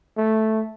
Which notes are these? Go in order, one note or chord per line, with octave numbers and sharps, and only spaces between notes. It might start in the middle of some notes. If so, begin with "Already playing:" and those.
A3